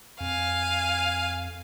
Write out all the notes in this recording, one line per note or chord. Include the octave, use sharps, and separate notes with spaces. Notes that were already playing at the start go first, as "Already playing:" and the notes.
F2 F5 G#5